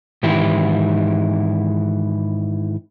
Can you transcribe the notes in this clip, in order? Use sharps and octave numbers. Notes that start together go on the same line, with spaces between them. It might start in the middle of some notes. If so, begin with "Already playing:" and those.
G#2 D#3 E3 E4 G4